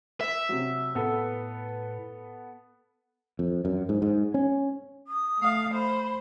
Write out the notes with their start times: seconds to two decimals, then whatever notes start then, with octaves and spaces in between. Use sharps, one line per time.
0.21 E5
0.49 C3 F#3
0.95 A2 B3 A4 B4
3.39 F2
3.65 F#2
3.89 G#2
4.02 G#2
4.34 C#4
5.07 D#6
5.39 A3 F5
5.74 C5 B5